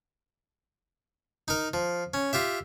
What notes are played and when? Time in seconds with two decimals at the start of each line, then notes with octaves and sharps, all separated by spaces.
1.48 D#4 A#4
1.74 F3
2.14 C#4
2.33 F4 G4 E5